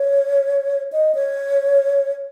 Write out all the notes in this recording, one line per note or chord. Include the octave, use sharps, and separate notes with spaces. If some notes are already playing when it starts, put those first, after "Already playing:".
Already playing: C#5
D#5
C#5